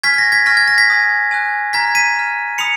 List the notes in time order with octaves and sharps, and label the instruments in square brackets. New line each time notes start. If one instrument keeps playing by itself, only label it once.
[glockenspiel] G#5 C#6 F6 G#6 B6
G#6
A#6
G#6 B6
G#5 C#6 F6 A#6
G#6
A#6
G#6 B6
G#5 D#6 F#6
G#5 D#6 F#6
A#5 F6 G#6 B6
B6 D#7
A#5 F6
B5 D#6 C#7 F7